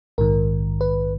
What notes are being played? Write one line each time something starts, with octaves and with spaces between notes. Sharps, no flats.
A#1 G#2 D#3 A#4
B4